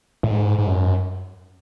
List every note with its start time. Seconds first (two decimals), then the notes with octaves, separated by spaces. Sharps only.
0.23 A2
0.31 G#2
0.58 G#2
0.67 F#2